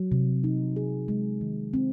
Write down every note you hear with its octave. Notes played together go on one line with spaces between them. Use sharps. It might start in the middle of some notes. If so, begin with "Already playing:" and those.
Already playing: F#3
C3
D#4
G#4
G#3
D#3
C4